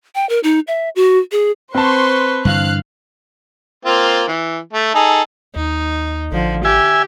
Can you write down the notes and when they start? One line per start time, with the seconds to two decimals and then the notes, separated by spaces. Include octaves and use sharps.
0.15 G5
0.29 A#4
0.43 D#4
0.67 E5
0.96 F#4
1.32 G#4
1.74 C4 B4 C5 A5 C6 C#6
2.45 G2 D3 E3 F5 F#6
3.85 A#3 C4 F4
4.28 E3
4.73 A3
4.95 D#4 G#4 A4
5.56 D#2 D#4
6.31 A1 D3 F3
6.65 G4 E5 G#5